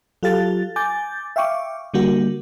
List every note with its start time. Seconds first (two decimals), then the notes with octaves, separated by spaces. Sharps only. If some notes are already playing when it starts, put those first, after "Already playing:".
0.23 F#3 F4 G4 A4 F5 A6
0.76 G#5 D6 G6 A6
1.36 E5 F5 G5 C#6 D6
1.94 D3 G3 A#3 F#4